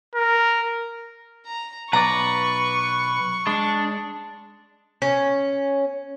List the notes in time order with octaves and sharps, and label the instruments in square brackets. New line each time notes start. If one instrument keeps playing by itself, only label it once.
[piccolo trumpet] A#4
[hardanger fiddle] A#5
[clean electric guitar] B1 D5 [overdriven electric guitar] B4 [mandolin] A#5 [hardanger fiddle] C#6
[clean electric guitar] G#3 [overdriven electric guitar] D4
[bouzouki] C#4